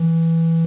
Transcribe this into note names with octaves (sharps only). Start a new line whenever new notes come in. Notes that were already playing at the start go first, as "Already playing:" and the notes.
Already playing: E3